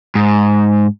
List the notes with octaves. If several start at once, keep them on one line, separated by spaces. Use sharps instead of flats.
G#2